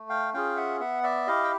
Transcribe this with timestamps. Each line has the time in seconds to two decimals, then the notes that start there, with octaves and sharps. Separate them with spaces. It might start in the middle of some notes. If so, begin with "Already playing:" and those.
Already playing: A3
0.09 F5 G5
0.34 C#4 F4 G#4 F5 G5
0.56 E5 F#5
0.80 B3 E5 F#5
1.03 D5 E5
1.27 E4 G4 D#5 F5
1.43 G5